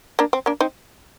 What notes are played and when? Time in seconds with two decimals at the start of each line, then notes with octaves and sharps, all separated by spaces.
0.19 A#3 D4
0.33 C4
0.46 A#3 D4
0.60 C4 D#4